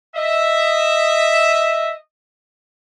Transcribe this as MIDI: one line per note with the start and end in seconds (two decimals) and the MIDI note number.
0.16 1.92 75
0.16 1.92 76